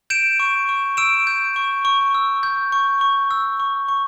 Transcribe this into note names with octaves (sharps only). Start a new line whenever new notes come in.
G6 D7 E7
C#6
C#6
E6 D7 E7
G6
C#6
C#6
E6
G6
C#6
C#6
E6
C#6
C#6